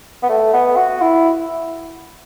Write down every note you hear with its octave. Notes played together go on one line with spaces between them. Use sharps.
B3
A3
B3
F#4
E4